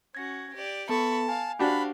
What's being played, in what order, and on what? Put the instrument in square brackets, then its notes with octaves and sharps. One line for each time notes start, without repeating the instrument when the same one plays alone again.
[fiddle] C#4 F#4 [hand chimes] G#6 A#6
[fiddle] G4 D5
[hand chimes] B3 A4 [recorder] A5 [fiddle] B5 C#6
[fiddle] F5 [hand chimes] G#5
[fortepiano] D4 F#4 G4 [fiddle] C5 F5 [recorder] B5